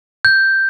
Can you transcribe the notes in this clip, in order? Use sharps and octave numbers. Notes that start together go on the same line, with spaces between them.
G6